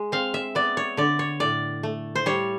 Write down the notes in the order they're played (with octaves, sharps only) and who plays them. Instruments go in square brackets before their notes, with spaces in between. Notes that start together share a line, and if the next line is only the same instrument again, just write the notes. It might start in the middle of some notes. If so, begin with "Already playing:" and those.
Already playing: [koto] G#3
C4 F5
E5
B3 D5
C#5
D3 D5
C#5
A2 D5
A3
C5
G3 C#5